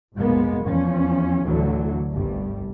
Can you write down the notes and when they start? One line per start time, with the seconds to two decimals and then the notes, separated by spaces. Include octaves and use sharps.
0.15 F1 B1 A#2 G#3 A#3 B3
0.65 E2 F3 C#4
1.46 D2 A2 D3 E3 F#3
2.13 G1 C2 G2 G3